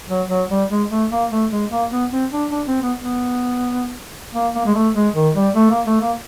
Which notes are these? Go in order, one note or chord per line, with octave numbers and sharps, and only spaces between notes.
F#3
F#3
G3
G#3
A3
A#3
A3
G#3
A#3
B3
C4
D4
D4
C4
B3
B3
A#3
A#3
G#3
A3
G#3
D#3
G3
A3
A#3
A3
A#3